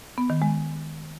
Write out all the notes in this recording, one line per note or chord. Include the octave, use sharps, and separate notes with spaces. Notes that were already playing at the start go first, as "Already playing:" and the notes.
B3
D#3
G#3